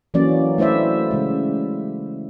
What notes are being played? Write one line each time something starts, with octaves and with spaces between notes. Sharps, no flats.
E3 F#3 A#3 C#4 D5
A3 E4 C5 D5 E5
C#3 G#3